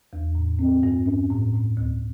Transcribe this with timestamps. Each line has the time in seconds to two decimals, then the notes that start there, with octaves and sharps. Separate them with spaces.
0.13 E2
0.35 A2
0.59 C4
0.83 G2
1.06 C#4
1.30 A2
1.54 A2
1.77 D2